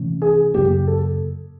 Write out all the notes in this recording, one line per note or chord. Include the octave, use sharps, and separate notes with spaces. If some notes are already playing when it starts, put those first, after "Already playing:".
Already playing: C3 E3 A3 C#4
G#4
F#2 C#3 F#3 A#3 G4
A4